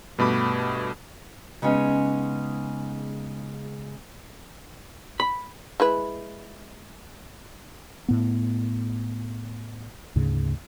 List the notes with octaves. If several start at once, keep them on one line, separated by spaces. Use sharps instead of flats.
G2 B2 A3 B5 D6
C#3 G#3 B3 C#4 D#4
B5
G#3 E4 B4
A2 B3
D2 G#2 C#3